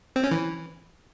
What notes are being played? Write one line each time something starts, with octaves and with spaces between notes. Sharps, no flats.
C4
C#4
E3